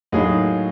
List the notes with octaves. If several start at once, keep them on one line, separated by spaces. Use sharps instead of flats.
A2 F#3 A#3 D#4 G#4